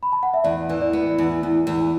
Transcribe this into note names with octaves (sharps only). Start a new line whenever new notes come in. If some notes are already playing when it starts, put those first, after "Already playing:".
B5
A5
F#5
E5
E2 D5
E3
D5
B3
E2
E2
E2